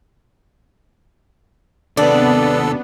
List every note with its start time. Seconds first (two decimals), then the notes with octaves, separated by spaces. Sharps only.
1.97 D#2 C3 B3 D4 A4 D5